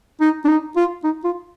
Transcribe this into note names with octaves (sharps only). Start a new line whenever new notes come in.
D#4
D4
D#4
F4
D#4
F4